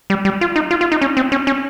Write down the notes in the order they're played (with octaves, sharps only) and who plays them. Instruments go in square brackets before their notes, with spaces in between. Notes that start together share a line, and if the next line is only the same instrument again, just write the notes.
[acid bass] G3
G3
F4
D#4
F4
F4
D#4
C#4
C4
C#4
C#4